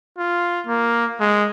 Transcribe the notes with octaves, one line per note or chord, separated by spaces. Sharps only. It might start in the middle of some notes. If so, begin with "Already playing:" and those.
F4
A#3
G#3